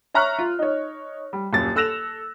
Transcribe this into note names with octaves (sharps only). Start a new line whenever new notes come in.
C#5 E5 A#5 C#6 F6 F#6
F4
D#4 C#5
G3
D#1 F#2 A6
A4 E6 F#6 A#6 E7 F7